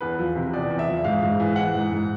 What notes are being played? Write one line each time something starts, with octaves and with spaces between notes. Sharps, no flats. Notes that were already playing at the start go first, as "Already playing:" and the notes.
E2 B4
F3
C3
E2 D5
E2
E5
F3
G#2 F5
G#2
E3
E3 F#5
G#2
G#2